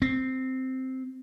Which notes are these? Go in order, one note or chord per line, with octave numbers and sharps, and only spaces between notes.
C4